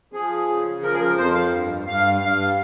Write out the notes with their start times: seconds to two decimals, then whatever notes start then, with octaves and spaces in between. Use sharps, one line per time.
0.13 F3 G#4
0.48 C#3
0.82 F3 A#4
0.94 G#4
1.00 A#4
1.17 F2 C5
1.34 F5
1.52 G2
1.87 G2 F5
2.21 G2 F5